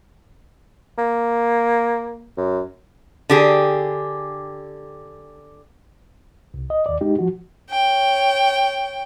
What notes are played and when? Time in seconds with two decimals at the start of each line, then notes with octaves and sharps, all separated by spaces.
0.98 A#3
2.37 F#2
3.30 D3 G4 G#4
6.54 C2
6.70 D#5
6.86 D#2 D5
7.01 G#3 D#4 G4
7.19 F3 F#4
7.71 C#5 G5